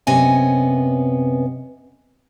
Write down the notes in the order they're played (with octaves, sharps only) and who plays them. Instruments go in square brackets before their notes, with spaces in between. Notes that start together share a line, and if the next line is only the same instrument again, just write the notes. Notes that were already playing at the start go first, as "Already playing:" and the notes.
[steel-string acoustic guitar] F#2 C3 B3 C#4 D#5 G#5